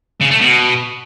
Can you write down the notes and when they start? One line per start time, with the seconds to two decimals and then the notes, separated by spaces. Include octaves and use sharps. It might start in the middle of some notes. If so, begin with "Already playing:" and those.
0.21 C#3
0.31 A3
0.40 B2